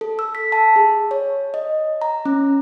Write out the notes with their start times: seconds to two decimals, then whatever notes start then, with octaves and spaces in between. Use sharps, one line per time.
0.01 A4
0.19 E6
0.35 B6
0.52 A5
0.76 G#4
1.11 C#5
1.54 D#5
2.02 A#5
2.25 C#4